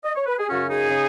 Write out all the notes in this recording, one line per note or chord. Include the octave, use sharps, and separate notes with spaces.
D#5
C#5
B4
G#4
F#2 C#3 C#4 F#4
D#4 G#4
C#3